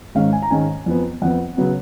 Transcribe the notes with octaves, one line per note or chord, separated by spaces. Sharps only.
G#2 D#3 G#3 C#4 F5
G#5
A#5
G#2 D#3 G#3 C#4 G#5
F2 F3 B3
F2 F3 B3 F#5
C#3 F#3 B3